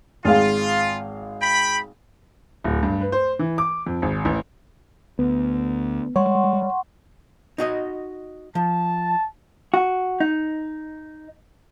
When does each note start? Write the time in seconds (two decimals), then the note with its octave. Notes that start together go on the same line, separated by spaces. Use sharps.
0.25 G#1 G#3 F4 F5
1.42 G5 B5
2.64 D1
2.83 G2
3.01 B4
3.12 C5
3.39 E3
3.58 D6
3.87 F2
4.02 G#1
4.25 A1
5.19 D2 B3
6.16 G3 G#3 C#5 F#5 C6 C#6
7.58 D#4 F#4 D#5
8.55 F3 A5
9.74 F#4
10.20 D#4